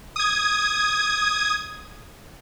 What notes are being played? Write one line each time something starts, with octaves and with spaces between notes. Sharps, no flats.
D#6 G#6